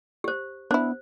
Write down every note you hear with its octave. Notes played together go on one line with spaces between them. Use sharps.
G4 C5
B3 D4 E4 C5